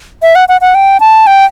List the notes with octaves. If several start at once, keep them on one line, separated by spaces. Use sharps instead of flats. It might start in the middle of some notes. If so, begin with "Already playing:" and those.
E5
F#5
F#5
F#5
G5
A5
G5